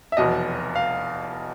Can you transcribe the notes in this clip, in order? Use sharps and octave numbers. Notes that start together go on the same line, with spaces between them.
E5
F1 E2 B2 F#3 D#5
F5